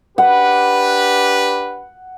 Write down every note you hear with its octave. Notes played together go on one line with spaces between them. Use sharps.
D4 G4 B4 F#5